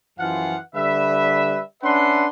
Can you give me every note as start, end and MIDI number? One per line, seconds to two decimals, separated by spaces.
0.19 0.55 42
0.19 0.55 52
0.19 0.55 53
0.19 0.55 65
0.19 0.55 77
0.19 0.55 78
0.75 1.60 50
0.75 1.60 55
0.75 1.60 71
0.75 1.60 76
1.83 2.26 61
1.83 2.26 62
1.83 2.26 71
1.83 2.26 76
1.83 2.26 78
1.83 2.26 84